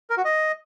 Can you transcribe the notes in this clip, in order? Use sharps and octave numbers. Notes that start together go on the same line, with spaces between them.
A#4
F#4
D#5